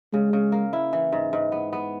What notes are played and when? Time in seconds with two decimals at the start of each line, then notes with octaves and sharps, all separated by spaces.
0.13 C#3 G#3
0.33 C#3
0.52 A#3
0.73 E4
0.93 E3
1.13 G#2
1.33 G#2
1.52 B3
1.73 B3